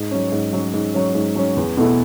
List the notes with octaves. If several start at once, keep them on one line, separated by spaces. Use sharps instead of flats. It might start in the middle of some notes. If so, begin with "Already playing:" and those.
Already playing: G#2
F#3 C#4
G#2
F#3 C#4
G#2
F#3 C#4
G#2
F#3 C#4
E2
B2 A3 E4